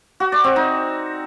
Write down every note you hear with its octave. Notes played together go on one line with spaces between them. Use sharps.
F#4
D5
C4
D#4